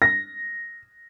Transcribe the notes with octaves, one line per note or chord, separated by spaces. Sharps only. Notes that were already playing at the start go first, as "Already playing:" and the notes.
A#6